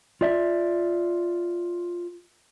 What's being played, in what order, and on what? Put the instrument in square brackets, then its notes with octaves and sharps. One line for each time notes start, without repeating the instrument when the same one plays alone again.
[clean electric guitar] F4 D5 E5